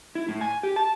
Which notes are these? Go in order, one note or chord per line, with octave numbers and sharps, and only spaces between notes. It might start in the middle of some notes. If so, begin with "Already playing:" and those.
E4
A2
G#5
G4
A5